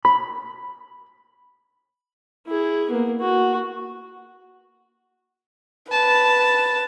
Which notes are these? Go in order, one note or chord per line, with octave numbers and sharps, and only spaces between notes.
B5
E4 G#4
A#3 B3
F#4
B4 A5